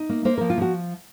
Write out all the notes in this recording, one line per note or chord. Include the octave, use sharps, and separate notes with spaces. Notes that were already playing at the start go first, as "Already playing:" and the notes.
Already playing: D#4
A#3
A#3 C5
F3 A#4
F4
F3 F#4